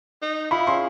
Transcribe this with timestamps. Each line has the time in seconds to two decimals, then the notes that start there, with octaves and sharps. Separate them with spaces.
0.22 D#4
0.51 E4 F4 B5
0.67 C#4 G#4 C6 D#6